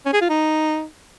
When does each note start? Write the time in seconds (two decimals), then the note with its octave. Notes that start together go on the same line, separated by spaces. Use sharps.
0.05 C#4
0.13 G#4
0.21 F4
0.29 D#4